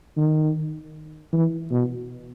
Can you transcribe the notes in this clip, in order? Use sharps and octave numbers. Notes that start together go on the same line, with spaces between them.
D#3
E3
B2